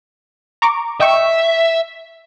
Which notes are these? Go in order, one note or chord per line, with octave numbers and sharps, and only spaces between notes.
A#5 C#6 D6
D#5 E5 G5 C#6